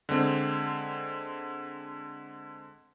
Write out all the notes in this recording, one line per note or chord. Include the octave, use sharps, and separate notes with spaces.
D3 G#3 C4